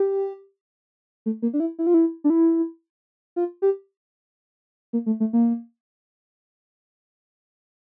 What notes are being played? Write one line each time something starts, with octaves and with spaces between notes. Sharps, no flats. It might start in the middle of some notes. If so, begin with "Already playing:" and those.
Already playing: G4
A3
A#3
D4
E4
E4
F4
E4
D4
E4
F4
G4
A#3
A3
A3
A#3